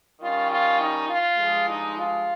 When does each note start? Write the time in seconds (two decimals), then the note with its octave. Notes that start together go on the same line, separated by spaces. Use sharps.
0.20 D#3 G3 C#4 F4
0.50 F4
0.80 D#4
1.09 F4
1.38 G2 F3 G#3
1.68 D#4
1.97 F4